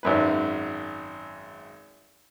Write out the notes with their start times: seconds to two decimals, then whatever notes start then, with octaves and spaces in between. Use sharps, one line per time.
0.03 G#1 F#2 B4